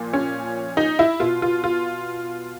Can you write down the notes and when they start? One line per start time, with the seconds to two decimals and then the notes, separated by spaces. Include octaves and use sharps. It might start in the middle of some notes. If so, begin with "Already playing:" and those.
Already playing: A#2 F3
0.13 C#4
0.77 D#4
0.99 E4
1.20 B2 F4
1.42 F4
1.64 F4